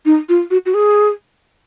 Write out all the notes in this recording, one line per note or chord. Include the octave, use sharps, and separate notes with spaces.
D#4
F4
F#4
F#4
G#4